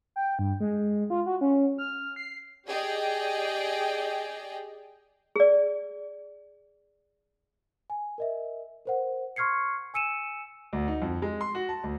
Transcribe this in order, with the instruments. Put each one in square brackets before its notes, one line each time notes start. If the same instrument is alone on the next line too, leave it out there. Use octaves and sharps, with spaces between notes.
[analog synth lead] G5
G2
G#3
F4
F#4
C#4
F6
C7
[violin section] G4 G#4 D5 D#5 G5
[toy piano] G#4 D5
[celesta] G#5
A#4 D#5 E5
A#4 C5 F#5
C6 C#6 F6 G#6 C7 C#7
G#5 E6 C#7 D#7 E7
[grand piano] D2
D#4
F2
G#3
C6
F#4
A5
D2